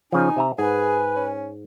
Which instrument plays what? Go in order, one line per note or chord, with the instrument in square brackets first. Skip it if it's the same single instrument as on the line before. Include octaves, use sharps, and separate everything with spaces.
[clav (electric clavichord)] C#3 F3 [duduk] D#4 [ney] G#5
[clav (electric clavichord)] C3 E5 A#5
[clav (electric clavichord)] G#2 [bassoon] G#4 [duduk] B4 [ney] G#5
[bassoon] C#4